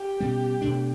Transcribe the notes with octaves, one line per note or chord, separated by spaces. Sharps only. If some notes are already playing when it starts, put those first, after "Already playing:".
Already playing: G4
B2 G3 C#4
B2 A3 D4